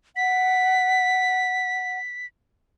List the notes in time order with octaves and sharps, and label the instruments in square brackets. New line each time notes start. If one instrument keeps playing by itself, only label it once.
[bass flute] F#5 [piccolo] B6